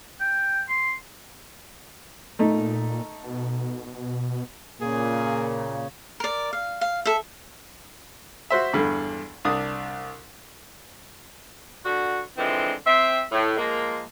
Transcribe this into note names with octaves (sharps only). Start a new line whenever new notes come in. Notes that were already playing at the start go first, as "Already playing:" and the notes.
G5
C6
A#2 A3 D#4
B2
A#2 C#3 A#3 G#4
A#4 D5
F5
F5
A4 E5
F#4 C5 E5
E2 G2 D3
C2 D4 D#6
D3 F#4
D3 E3 F3 G#3 C4
C4 E5
A2
F3 G#3 A#3